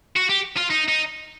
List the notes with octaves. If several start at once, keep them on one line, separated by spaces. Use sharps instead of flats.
F#4
G4
F4
D#4
D#4